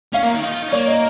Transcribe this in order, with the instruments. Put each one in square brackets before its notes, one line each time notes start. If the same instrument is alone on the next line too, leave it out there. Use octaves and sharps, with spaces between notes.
[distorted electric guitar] C#4 [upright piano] F5
[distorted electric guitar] A#3
D#3
D#4
F4
D#4
C#4
[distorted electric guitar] A#3 [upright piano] C#5
[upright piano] D#5